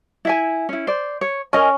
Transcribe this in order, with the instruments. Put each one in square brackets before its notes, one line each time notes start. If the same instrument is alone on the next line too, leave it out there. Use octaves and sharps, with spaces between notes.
[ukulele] E4 E5 G#5
C#4 E4
C5 D5
C#5
[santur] C#4 [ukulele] A#4 D#5 G#5